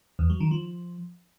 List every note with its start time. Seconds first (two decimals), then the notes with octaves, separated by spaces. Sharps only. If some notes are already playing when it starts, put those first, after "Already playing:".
0.19 E2
0.30 F#3
0.40 D#3
0.51 F3